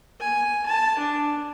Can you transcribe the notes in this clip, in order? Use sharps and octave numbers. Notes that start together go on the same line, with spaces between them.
G#5
A5
D4